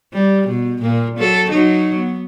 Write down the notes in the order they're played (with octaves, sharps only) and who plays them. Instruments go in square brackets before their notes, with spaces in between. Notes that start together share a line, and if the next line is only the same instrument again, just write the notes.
[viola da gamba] G3
B2
A#2 A#3
F#3 A4
F#3 D#4
B3